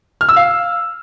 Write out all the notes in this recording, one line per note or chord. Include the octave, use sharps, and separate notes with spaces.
F6
E6
F5